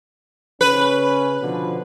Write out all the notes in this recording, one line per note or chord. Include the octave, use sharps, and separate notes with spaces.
C#3 C#4 B4
B2 D3 F3